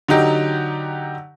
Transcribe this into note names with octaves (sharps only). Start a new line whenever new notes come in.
D3 F#3 D#4 G4